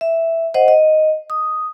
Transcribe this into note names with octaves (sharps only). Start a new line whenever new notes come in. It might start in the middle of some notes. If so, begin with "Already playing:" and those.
E5
C5 D#5 F#5
D#5
D#6